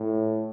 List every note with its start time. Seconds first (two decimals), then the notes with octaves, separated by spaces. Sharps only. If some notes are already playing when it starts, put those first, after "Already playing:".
Already playing: A2